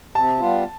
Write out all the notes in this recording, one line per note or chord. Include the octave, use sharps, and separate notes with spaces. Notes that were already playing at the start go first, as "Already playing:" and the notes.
C3 A5
G3 B3 F4